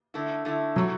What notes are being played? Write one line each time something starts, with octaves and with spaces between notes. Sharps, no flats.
D3 A3 E4
D3 A3 E4
E3 F#3 A3 F#4 A4